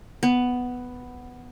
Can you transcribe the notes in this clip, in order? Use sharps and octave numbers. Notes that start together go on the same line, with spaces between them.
B3